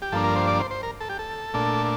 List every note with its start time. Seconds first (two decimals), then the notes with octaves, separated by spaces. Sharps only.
0.02 G4
0.12 G2 F3 A#3 D4 A4
0.24 A#4
0.36 C5
0.47 D5
0.60 C5
0.71 C5
0.83 A#4
1.00 A4
1.09 G4
1.19 A4
1.54 A#2 A3 D4